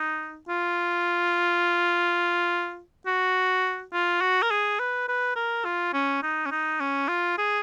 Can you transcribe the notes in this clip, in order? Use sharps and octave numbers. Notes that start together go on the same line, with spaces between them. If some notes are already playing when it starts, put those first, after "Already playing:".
Already playing: D#4
F4
F#4
F4
F#4
A#4
G#4
B4
B4
A#4
F4
C#4
D#4
C#4
D#4
C#4
F4
G#4